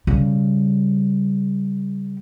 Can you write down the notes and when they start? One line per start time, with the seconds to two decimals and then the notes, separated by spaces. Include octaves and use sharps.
0.07 C#3 G3